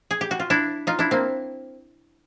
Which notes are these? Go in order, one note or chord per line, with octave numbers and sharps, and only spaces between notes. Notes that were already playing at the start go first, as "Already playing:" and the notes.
G#4
G4
F#4
F4
D4 E4
D#4 F4
D4 E4
A#3 C4